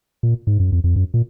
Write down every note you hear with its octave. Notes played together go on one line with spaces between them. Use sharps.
A#2
G#2
F#2
F2
F2
F#2
A#2